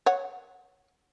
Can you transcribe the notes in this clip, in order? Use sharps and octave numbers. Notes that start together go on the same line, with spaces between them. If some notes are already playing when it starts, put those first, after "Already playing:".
C#5 F#5